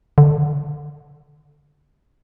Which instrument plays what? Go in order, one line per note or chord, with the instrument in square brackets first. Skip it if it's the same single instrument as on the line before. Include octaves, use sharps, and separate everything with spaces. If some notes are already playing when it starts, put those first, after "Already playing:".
[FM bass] D3